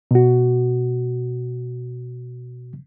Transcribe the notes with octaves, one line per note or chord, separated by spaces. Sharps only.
B2 F#4